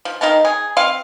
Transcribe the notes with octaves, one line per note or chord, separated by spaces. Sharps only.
F3
D#3 D#4 F5 A5
G#4
C4 F4 F5